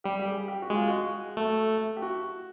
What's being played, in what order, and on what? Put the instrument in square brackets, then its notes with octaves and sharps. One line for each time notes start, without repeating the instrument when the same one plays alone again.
[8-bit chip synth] G3 [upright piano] G4
[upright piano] G4
G#4
G4
F#4
[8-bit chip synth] G#3 [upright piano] F4
[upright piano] F#4
[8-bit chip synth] A3
[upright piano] G4
F#4